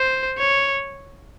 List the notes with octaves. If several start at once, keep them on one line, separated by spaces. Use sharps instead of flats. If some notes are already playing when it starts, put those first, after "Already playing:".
Already playing: C5
C#5